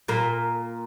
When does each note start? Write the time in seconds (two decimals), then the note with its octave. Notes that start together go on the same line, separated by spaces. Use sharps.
0.08 A#2 A#3